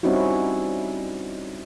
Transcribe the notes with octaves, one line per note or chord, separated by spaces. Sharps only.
G3 C4 C#4 D#4 E4 F#4